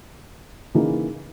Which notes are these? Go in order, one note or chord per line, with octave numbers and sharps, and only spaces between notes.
C#3 E3 A#3 D#4 G#4